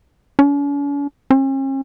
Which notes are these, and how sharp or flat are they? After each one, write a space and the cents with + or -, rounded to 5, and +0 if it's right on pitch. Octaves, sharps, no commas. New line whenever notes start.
C#4 +45
C#4 -45